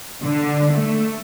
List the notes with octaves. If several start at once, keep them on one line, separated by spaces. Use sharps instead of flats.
D3
A3